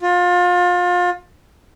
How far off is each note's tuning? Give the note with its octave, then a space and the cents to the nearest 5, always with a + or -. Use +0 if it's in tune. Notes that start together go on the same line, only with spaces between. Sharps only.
F4 +30